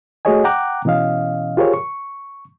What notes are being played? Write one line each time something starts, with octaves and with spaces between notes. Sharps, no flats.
A3 F#4 G#4 C#5 D#5 G#5
F#5 G5 A#5 D6 F#6
B2 E3 C#4 D#5 F5
F4 G4 G#4 A#4 C5 C#5
C#6